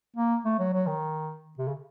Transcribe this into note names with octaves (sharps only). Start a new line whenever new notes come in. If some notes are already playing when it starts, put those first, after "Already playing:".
A#3
A3
F#3
F#3
D#3
C3
C#3